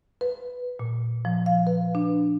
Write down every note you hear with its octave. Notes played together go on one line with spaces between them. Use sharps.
B4
A#2
F3
F5
B4
D4